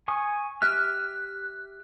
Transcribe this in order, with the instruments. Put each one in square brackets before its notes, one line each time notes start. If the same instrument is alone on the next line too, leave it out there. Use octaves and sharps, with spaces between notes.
[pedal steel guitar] G#5 C#6 D#6
[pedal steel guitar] G4 E5 F6 [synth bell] F#6